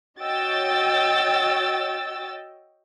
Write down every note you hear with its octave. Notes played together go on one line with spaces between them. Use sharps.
F#4 C#5 D#5 G5 E6 A6